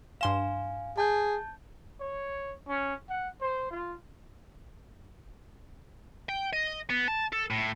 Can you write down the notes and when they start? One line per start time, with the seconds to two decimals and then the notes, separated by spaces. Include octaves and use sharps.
0.21 G2 F5 G#5 C6 E7
0.98 G#4 A5 G6
2.00 C#5
2.68 C#4
3.09 F#5
3.41 C5
3.71 F4
6.29 G5
6.53 D#5
6.90 B3
7.08 A5
7.32 A4
7.50 A2